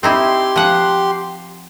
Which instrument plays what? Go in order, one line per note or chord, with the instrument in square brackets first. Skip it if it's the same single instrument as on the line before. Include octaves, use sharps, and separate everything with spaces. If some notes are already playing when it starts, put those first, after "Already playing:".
[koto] C4 D#4 E4 [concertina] G4 C6
[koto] F3 F#5